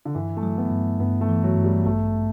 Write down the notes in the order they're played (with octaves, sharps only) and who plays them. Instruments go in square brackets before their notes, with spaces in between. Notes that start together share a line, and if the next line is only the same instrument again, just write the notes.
[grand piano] D3
[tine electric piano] G2 [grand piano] E3
[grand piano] A3
[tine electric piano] F#3
[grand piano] B3
[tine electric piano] G2
[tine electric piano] G2 [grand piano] B3
[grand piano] A3
[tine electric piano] E3
[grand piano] F#3
[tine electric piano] G2
[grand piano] G3
[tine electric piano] A1 [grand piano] A3